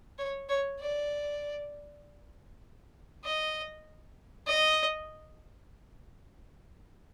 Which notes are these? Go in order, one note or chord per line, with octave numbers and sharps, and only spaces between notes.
C#5
C#5
D5
D#5
D#5